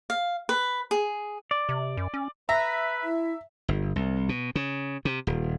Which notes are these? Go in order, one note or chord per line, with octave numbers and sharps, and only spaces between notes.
F5
B4
G#4
D5
C3
F#2
C#4
B4 E5 A#5
E4
G1
C2
B2
C#3
C3
D#1